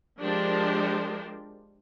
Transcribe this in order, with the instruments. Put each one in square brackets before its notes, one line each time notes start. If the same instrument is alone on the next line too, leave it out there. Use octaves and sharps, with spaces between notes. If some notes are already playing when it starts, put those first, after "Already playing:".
[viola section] F3 G#3 D4 G4 A#4 C5